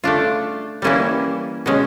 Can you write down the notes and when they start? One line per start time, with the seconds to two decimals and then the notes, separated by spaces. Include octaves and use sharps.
0.04 A3 D4 F4
0.82 E3 G3 A#3 C#4 E4
1.66 B2 G#3 C#4